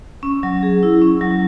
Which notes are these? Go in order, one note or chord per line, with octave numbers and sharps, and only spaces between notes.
C#4
F#3
G#4
E4
C#4
F#3